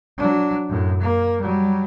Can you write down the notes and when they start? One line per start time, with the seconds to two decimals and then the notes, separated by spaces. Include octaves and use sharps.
0.18 F#3 D4
0.69 F#2 A2
1.01 A#3
1.41 F#3 G3